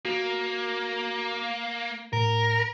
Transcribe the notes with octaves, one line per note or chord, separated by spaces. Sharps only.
A#3 F#4
A2 A#4